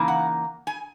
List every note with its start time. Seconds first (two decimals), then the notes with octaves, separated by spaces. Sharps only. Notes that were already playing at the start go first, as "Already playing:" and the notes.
Already playing: C#3 E3 A#3 D#4
0.08 F#5
0.67 G#5